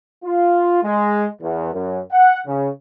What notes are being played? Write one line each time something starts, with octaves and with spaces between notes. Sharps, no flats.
F4
G#3
E2
F#2
F#5
C#3